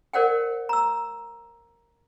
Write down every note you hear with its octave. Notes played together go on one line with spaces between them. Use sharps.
G#4 A#4 C5 D5 F#5 G5
A#5 E6